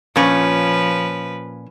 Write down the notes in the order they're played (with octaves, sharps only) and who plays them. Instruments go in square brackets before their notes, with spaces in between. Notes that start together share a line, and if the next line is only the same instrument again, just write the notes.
[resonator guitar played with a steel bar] A#2 C#4 [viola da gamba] F3 B4